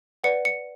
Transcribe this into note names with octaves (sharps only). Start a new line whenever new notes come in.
B4 D5 F#5 C#7
C#7